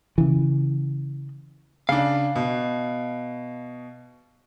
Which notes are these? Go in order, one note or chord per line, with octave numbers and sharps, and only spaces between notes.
C#3 E3
C#3 D4 F5
B2